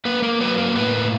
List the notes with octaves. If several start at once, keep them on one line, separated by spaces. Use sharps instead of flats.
A#3 B4
A#3 A#4
F#3 B4
A#3 A#4
A2 B4
A#3